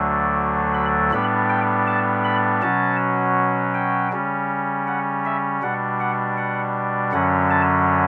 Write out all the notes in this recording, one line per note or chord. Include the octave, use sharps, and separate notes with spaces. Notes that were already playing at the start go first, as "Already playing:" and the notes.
Already playing: D2 D3 F#3 A3 D4
B5
A2 G3 B3 D4 B5
G5
A5
B5
B2 F#3 C#4 A5
G5
C#3 G3 C#4
F#5
E5
B2 G3 D4 F#5
F#5
F#5
F#2 D3 F#3 C#4 F#5
A5